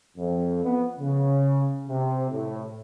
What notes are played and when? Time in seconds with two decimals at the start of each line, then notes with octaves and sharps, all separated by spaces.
0.17 F2
0.64 B3
0.98 C#3
1.87 C3
2.31 A2